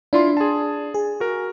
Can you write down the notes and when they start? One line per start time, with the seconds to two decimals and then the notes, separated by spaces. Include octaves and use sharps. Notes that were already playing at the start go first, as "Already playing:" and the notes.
0.13 D4 E4 F4 C6
0.37 G#4 A5
0.94 G#4
1.20 F#4 A#4